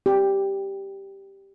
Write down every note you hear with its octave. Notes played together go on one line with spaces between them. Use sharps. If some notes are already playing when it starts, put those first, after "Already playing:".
G4